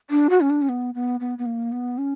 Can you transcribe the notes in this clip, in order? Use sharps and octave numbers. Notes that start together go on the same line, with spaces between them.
D4
F#4
C#4
D4
C#4
B3
B3
B3
B3
A#3
B3
C#4